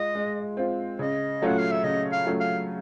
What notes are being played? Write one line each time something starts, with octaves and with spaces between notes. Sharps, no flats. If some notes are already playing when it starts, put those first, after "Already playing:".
Already playing: G#3 F4 D#5
G#3
C4 F4
C#3 D#5
F#3 A3 C#4 F4 F#5
F5
E5
C#3 D#5
F5
F#3 A3 C#4 F4
F5